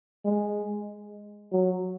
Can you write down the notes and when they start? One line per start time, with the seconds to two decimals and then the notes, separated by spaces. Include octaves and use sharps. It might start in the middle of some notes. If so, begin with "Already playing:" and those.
0.25 G#3
1.52 F#3